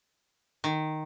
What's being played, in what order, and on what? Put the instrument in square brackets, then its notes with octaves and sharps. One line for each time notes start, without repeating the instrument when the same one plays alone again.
[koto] D#3